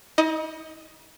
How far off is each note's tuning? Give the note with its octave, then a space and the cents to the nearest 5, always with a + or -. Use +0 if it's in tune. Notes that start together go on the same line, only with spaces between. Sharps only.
D#4 +45 D#5 +0